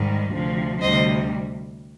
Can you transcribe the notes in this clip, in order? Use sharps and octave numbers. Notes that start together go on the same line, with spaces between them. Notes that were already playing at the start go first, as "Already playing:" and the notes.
Already playing: G#2 D#3 G3
D2 C3 F3
D2 C3 G3 C5 D#5